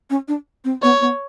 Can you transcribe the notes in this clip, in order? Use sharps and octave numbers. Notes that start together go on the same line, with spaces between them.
C#4
D4
C4
B3 C#5
B3